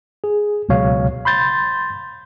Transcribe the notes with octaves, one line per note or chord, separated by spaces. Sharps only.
G#4
C#2 B2 F#3 C#5 F5
B5 C6 G6 A6